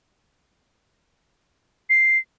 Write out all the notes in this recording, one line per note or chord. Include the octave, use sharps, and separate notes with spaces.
C7